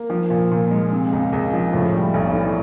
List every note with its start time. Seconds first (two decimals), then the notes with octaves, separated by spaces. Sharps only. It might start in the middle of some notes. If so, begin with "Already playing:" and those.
Already playing: A#3
0.10 F3
0.30 A#2
0.51 A#2
0.71 G#3
0.92 C3
1.13 C#2
1.33 C#2
1.53 F3
1.73 A2
1.94 G3
2.14 B1
2.35 E3